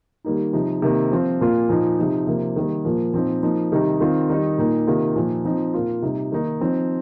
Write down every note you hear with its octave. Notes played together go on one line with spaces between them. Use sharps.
D#3 G3 A#3 D#4
C3 F3 D#4
C3 D#3 A#3
F3 C4 F4
A#2 A#3 F4
A#2 F3 D#4
C3 F3 D#4
C3 F3 A#3
D#3 G3 A#3
A#2 F3 A#3
A#2 F3 C4 D#4
F3 A#3 D#4
C3 D#3 G3 D#4
D#3 C4 F4
D#3 G3 D#4
A#2 A#3 D#4
C3 D#3 A#3 F4
A#2 F3 A#3 D#4
F3 C4 D#4
A#2 A#3 F4
C3 G3 D#4
D#3 A#3 D#4
F3 C4 D#4